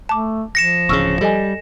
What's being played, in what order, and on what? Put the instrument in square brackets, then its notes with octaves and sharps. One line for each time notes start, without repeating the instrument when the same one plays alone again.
[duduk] A3 [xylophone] A5 D6
[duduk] F3 [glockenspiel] A#6 C#7 E7
[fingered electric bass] D1 C#3 [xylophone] C#6 E6 F6
[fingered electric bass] G3 [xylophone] A4 D#5 G#5